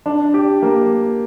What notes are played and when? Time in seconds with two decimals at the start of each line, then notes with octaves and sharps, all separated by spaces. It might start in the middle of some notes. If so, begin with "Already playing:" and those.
0.06 D4
0.34 G4
0.62 A#3